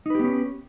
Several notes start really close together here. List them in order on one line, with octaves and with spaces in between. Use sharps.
D#4 B4 G4 B3 C#4